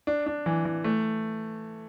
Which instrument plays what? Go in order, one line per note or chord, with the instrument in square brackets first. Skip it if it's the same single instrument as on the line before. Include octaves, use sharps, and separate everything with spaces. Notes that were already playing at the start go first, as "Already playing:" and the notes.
[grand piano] D4
D4
E3
E3
A3